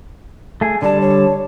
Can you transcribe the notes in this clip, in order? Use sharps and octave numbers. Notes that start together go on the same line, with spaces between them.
A3 G#4
D3 G3 D5 A5
C#5